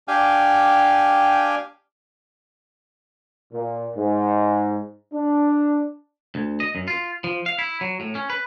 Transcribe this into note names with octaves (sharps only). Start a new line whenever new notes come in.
D4 G4 F5 G5 G#5
A#2
G#2
D4
D2
D#5
F#2
F4
F3
F5
E4
F#3
A2
C#4
B4